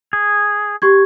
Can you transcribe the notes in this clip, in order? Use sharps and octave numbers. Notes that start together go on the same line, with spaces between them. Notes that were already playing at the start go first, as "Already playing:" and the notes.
G#4
G4 C#6 G#6